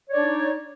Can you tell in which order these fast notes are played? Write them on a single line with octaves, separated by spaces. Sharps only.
C#5 D5 D4 D#4